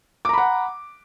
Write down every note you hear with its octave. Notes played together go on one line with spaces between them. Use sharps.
F#5 A#5 B5 D6